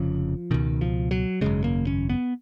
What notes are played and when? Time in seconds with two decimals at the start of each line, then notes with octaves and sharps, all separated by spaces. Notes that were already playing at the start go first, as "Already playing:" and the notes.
Already playing: F1 F2 C#3 F3
0.51 C#2 B2 D#3
0.81 F3
1.11 F#3
1.41 G#1 F#2 C#3 G#3
1.64 A#3
1.87 C#4
2.09 B3